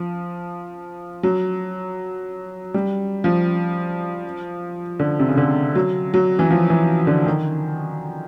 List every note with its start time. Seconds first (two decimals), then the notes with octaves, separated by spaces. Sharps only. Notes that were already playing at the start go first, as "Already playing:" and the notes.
Already playing: F3
1.23 F#3
2.74 G3
3.24 F3
5.00 D3
5.20 C3
5.28 C#3
5.37 D3
5.75 F#3
6.14 F#3
6.39 E3
6.51 F3
6.70 E3
7.07 D3
7.26 D#3